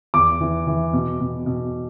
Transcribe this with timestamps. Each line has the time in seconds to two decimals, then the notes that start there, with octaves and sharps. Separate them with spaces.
0.14 E2 D6
0.41 E3
0.67 E3
0.93 B2
1.20 B2
1.46 B2